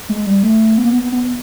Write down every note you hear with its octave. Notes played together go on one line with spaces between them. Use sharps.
G#3
G3
A3
B3
A#3
B3
B3